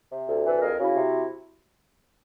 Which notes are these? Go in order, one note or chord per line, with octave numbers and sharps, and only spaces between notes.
C3
D2
E3 A4 B4
F2 G#4 A#4
C#3 E4 F#4
C3